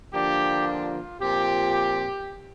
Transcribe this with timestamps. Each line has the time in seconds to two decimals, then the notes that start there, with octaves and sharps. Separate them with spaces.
0.13 D3 F3 A#3 D4 G4
0.67 F4
1.21 A#2 F3 C4 G4